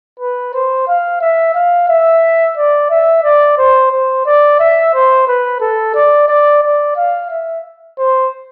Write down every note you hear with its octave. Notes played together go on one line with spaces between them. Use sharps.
B4
C5
F5
E5
F5
E5
D5
E5
D5
C5
C5
D5
E5
C5
B4
A4
D5
D5
D5
F5
E5
C5